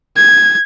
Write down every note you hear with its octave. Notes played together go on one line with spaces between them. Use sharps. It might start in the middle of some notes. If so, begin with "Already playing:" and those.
G#6